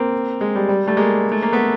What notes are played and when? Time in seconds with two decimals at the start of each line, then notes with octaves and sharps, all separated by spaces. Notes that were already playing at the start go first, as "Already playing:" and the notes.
Already playing: A#3 C4
0.41 G#3
0.55 G3
0.69 G3
0.87 G3 A3
0.97 G#3 A#3
1.32 A3
1.42 A#3
1.52 A3 B3